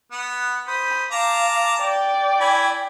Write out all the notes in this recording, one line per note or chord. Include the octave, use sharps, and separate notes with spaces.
B3 F#5
C5 B5 D#6
F5 A5 A#5 D6
D5 G5
E4 G#5 B5